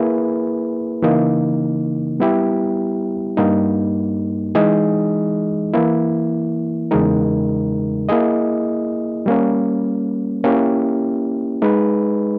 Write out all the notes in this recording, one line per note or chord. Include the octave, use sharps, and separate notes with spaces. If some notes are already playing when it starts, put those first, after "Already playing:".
Already playing: A#3 E4 G#4 B4
C#3 E3 A#3 D#4
G3 B3 E4 G4
G2 G3 A#3 D#4
E3 G#3 D#4 G#4 D#5
E3 A#3 E4
E2 C#3 G#3 D#4 A#4
A#3 E4 G#4 D#5
G3 A#3 C#4
A#3 C#4 E4 G4
G#3 D#4 G#4 B4